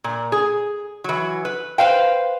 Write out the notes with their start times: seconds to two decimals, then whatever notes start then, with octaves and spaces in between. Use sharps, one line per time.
0.04 A#2
0.32 G#4
1.04 E3 F#3
1.45 B4
1.78 B4 C5 F5 G5